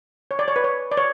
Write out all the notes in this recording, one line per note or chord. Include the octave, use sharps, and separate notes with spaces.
C#5
D5
C#5
B4
C#5
D5
C#5